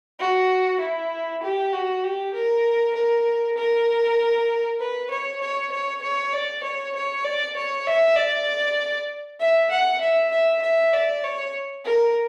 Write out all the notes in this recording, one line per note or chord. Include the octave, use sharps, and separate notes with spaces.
F#4
E4
G4
F#4
G4
A#4
A#4
A#4
B4
C#5
C#5
C#5
C#5
D5
C#5
C#5
D5
C#5
E5
D5
E5
F#5
E5
E5
E5
D5
C#5
A#4